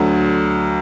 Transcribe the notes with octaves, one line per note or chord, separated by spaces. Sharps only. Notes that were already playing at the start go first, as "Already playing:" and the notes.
Already playing: D2 D3 F#3